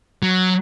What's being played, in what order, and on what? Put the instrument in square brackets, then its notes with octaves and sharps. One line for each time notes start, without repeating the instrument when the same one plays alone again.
[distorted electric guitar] F#3